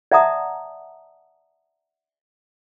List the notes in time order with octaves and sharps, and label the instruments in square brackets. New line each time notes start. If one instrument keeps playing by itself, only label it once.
[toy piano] D5 E5 F#5 A5 A#5 D#6